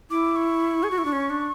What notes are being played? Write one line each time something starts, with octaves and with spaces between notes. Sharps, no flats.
E4 D6
C#6
G#4
F#4
E4
D4
C#4
D4